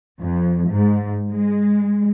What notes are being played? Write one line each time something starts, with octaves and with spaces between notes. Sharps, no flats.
F2
G#2
G#3